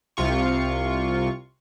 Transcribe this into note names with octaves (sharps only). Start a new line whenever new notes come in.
C2 C3 F4 C#6